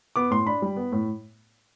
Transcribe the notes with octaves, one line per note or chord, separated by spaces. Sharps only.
B3 D6
A2 C6
D4 B5
G3
B3
A2